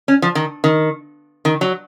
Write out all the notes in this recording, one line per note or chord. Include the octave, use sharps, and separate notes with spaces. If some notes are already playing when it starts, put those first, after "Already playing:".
C#4
F3
D#3
D#3
D#3
F#3